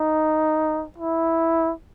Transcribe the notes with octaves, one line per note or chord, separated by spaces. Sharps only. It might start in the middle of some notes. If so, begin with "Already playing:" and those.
Already playing: D#4
E4